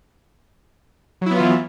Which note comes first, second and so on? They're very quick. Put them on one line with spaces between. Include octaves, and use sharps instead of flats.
F#3 E4 B3 F4 E3